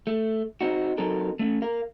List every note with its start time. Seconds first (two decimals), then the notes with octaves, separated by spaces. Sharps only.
0.07 A3
0.61 C4 D#4 F#4
0.98 F#3 C4 D#4 A4 A#4
1.39 A3 C#4
1.62 A#4 F5